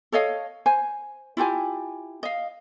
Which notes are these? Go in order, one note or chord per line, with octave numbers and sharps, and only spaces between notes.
A4 C#5 D#5 F5
C5 G#5
E4 F4 G4 G#5
D#5 F5